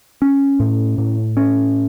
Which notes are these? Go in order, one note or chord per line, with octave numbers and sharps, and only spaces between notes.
C#4
A2
A2
C#4